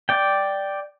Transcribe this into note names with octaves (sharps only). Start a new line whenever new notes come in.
D5 G5